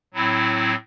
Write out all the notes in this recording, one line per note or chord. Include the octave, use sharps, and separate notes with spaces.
A2 F#3 C4 E4